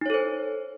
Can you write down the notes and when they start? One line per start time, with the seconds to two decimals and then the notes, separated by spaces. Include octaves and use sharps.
0.01 D#4
0.06 C#5
0.10 A4
0.14 C5